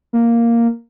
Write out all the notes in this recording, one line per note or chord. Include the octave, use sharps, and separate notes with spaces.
A#3